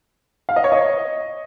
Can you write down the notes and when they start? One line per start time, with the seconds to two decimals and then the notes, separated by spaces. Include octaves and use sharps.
0.49 F5
0.56 D#5
0.64 C#5
0.72 D#5